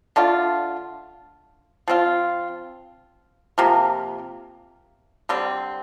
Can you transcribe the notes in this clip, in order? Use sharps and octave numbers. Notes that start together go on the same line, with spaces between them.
D3 A3 D4 F4
F3 C4 F4
C3 F3 A#3
D3 G3 C4